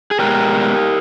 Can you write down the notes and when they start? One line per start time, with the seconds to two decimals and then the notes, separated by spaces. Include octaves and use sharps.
0.11 G#4
0.19 B2 G#3 B3 G4 A#4